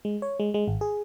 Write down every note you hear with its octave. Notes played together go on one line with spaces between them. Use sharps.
G#3
C#5
G#3
G#3
G#1
G#4